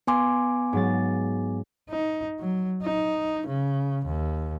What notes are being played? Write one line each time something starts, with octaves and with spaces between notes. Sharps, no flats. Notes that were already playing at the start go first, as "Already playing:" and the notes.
B3 G#5 C6 D6
G#2 F#3 A6
D#4
F#3
D#4
C#3
D#2